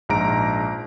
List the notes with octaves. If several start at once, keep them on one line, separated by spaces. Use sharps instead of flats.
A#1 G#2 A#5 D7